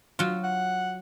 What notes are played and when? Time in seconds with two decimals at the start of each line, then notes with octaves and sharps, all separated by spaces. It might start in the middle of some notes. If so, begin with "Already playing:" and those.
0.19 F#3 F4
0.43 F#5